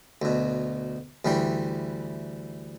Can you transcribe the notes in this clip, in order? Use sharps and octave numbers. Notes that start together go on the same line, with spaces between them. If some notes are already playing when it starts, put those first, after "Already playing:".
D2 B2
D2 E3 G3 G5